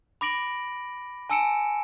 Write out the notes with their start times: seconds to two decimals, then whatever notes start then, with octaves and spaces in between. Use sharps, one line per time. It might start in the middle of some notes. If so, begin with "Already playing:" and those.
0.21 B5 D6 A#6 D7 F#7
1.30 G#5 A5 E6 C#7 D7 E7